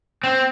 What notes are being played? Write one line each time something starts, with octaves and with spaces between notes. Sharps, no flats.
C4